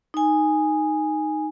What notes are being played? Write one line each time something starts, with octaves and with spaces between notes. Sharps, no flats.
D#4 G#5